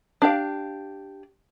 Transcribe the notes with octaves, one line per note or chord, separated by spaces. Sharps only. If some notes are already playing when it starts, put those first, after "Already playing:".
D4 G4 F5